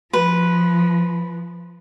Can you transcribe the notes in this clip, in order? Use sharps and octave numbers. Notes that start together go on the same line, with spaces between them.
F3 B4